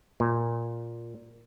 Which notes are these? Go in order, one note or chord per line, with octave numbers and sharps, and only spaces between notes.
A#2